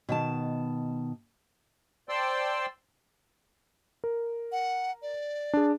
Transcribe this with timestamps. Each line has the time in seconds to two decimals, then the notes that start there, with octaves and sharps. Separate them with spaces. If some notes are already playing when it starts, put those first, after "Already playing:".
0.09 B2 D#3 A5
2.09 C5 D5 G5 A5 C6 E6
4.04 A#4
4.52 F#5
5.02 D5
5.53 D4 G#4